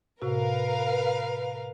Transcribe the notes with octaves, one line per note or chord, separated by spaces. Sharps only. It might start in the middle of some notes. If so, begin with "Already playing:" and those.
A2 C3 F#4 A#4 B4 F5